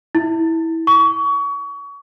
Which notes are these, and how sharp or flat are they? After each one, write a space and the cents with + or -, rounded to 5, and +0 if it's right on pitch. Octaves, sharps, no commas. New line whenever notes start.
E4 -20
C#6 +30